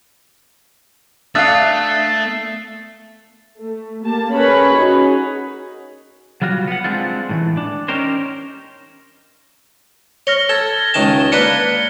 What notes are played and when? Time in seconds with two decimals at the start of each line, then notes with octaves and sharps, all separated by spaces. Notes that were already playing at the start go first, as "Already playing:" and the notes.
1.35 A3 D4 E5 F5 D#6 F#6 A6 C7
3.60 A3
4.05 A#3 G4 A5
4.34 C#4 G#4 A#4 B4 C#5 B5
4.76 C#4 D#4 F#4 G#4
6.42 F#3 G3 F4 F#4
6.67 B3 F#5
6.84 G#3 C4 D4 F4
7.29 A2 D#3 E3
7.57 D4
7.88 C#4 D#4 G4 A#4 C5
10.27 C#5 F6 A#6 G7
10.49 A4 G#6 A6
10.94 C#2 D#3 A5
11.32 A#3 D4 B4 C#7 G7